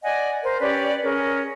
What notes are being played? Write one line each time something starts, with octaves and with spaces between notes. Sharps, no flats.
D5 D#5 F#5 G#5
A#4 C5
C#4 G4 B4 D5
C#4 G#4 A#4